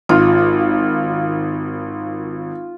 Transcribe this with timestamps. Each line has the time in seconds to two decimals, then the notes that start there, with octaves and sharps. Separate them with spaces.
0.09 G#1 F4